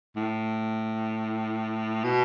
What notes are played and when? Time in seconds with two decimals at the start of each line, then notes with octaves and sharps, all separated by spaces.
0.16 A2
2.04 B2